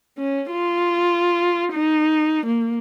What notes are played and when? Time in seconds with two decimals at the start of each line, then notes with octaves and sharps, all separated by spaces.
0.18 C#4
0.51 F4
1.73 D#4
2.46 A#3